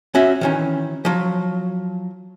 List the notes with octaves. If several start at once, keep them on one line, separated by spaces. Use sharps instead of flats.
C#4 F#4 E5
D#3 E3 C#4
F3 F#3